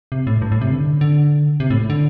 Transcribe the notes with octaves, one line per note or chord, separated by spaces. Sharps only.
C3
A2
G2
A2
C3
D3
D3
C3
A2
D3